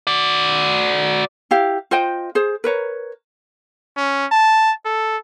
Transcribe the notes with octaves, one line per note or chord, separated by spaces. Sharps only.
F#4 D5
E4 G4 F5
F4 C5 D#5 G5
G#4 C5
A#4 B4 C#5 A#5
C#4
A5
A4